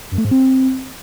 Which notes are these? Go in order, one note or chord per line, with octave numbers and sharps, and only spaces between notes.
F#2
A3
G#2
C4